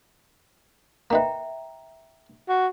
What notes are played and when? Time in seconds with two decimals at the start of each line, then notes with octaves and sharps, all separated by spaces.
1.10 A#3 D#4 B4 E5 G5 A#5
2.48 F#4